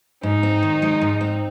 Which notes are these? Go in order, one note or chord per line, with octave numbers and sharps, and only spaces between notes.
G#2 D#4
C4
D#3
G#3
G#2
C4